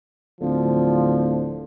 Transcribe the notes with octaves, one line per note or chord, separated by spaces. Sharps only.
D1 D3 F3